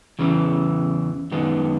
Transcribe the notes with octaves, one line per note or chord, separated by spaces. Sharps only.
E2 C#3 E3
F#2 D#3 G#3 B3 D4